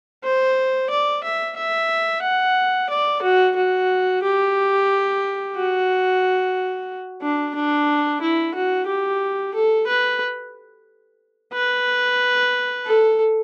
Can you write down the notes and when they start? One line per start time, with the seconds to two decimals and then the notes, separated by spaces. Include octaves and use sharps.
0.24 C5
0.90 D5
1.23 E5
1.57 E5
2.23 F#5
2.90 D5
3.22 F#4
3.56 F#4
4.23 G4
5.56 F#4
7.22 D4
7.55 D4
8.21 E4
8.54 F#4
8.87 G4
9.54 A4
9.87 B4
11.53 B4
12.86 A4